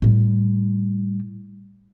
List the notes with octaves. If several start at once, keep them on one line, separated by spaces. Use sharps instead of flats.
A2 G3